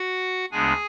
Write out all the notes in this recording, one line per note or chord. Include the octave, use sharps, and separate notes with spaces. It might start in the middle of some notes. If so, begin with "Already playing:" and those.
Already playing: F#4 F#5
D2 C#3 G#3 B3 D4 G#4 G#5